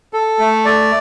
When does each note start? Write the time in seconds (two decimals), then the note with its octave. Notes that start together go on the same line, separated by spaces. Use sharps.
0.13 A4
0.39 A3
0.65 D5